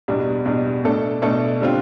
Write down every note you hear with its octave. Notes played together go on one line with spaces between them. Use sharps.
E2 B2 G3 D4
E2 B2 G3 D4
B2 A3 D4 A4
B2 A3 D4 A4
D3 G3 C4 F4